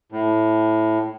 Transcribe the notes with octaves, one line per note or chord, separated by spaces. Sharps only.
A2